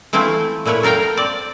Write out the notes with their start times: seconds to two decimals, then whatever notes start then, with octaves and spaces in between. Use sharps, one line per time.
0.13 E3 A3 C4 E4 F4
0.65 A#2 A3 E4 B4 C#5
0.83 A4 A#4 F5 G5 A#5
1.17 C4 D5